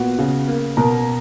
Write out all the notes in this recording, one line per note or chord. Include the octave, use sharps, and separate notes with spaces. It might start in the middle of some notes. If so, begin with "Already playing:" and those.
Already playing: A#2 B3 F#4
C#3
A#3
B2 A#4 A#5